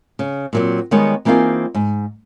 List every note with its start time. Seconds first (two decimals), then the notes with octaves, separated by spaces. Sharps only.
0.19 C#3
0.53 A#2 F#3 C4
0.91 D#3 G3 G#3 B3 C#5 D#5
1.25 E3 A#3 C4 D#4 F4 G#4
1.75 G#2